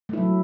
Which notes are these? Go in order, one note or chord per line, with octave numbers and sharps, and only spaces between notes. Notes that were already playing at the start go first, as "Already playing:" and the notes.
F#3 A3 E4